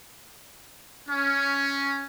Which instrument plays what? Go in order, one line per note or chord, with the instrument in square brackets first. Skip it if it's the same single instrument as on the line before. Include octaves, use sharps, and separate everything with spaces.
[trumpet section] C#4